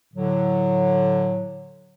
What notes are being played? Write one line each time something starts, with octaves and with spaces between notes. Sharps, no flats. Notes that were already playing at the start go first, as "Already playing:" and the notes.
A2 D3 F#3